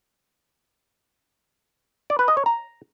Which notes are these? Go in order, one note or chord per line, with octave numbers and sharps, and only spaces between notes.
D5
B4
D#5
C#5
A#5